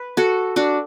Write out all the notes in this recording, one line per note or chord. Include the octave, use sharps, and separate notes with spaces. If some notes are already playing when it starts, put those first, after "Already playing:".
Already playing: B4
F#4 A4
D4 F#4